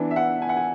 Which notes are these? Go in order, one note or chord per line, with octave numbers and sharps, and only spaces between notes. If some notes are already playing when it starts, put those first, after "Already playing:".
Already playing: E3 B3 D4
E5
F#5
G#5
F#5
G#5